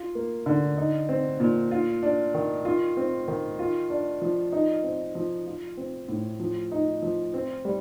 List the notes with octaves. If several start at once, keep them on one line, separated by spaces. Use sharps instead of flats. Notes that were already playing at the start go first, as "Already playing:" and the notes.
Already playing: F4
A#3
D3
D#4
C4
A#2
F4
D4
D#3
F4
C4
D#3
F4
D4
F3
D#4
C4
F3
F4
C4
A2
F3
D#4
F3
C4
G3